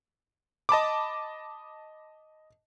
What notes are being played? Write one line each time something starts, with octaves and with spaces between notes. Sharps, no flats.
D#5 A5 B5 D6